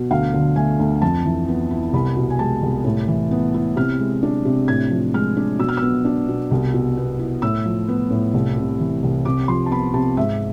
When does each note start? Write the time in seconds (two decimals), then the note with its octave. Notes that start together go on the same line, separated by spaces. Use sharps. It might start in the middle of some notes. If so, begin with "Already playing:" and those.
Already playing: B2
0.11 D2 F5
0.34 D3
0.56 A3 G#5
0.79 D2
1.02 F2 A5
1.25 E3
1.48 B3
1.71 E4
1.93 C2 B5
2.17 B2
2.30 G#5
2.39 G#3 A5
2.63 C2
2.85 A2
3.08 E3
3.31 B3
3.54 E4
3.76 C3 F6
3.99 G#3
4.23 D4
4.45 C3
4.68 A2 G#6
4.91 F3
5.14 G#3 F6
5.37 D4
5.59 B2 E6
5.69 F6
5.77 B3 E6
6.05 D4
6.28 B2
6.51 C2
6.74 B2
6.97 B3
7.19 E4
7.42 A2 E6
7.65 F3
7.88 B3
8.11 A2
8.34 C2
8.57 C3
8.80 E3
9.03 C2
9.25 C3 D6
9.48 F3 C6
9.66 A5
9.71 B3 B5
9.94 C3 A5
10.17 G#2 E5